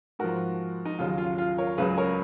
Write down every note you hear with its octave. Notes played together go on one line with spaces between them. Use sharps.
G#2 F3 F#4 A#4
D#4
D#2 C#3 F#3 F4
F4
F4
A#4 C#5
C#2 C#3 F#3 G#4 B4
A#4 C#5